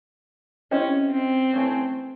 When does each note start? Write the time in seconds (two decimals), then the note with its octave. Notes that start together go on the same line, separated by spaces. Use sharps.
0.71 C4 C#4 E4 G4 C5 D#5
1.12 C4
1.53 E3 A3 C#4